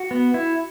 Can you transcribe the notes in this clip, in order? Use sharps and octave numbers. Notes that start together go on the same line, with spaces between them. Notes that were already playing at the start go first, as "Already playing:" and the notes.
Already playing: F#4
B3
E4